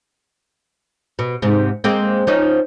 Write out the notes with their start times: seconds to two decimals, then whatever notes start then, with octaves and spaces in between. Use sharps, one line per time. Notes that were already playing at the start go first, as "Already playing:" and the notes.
1.19 B2
1.42 G#2 C3
1.84 G#3 A#3 C4
2.27 F3 C#4 D#4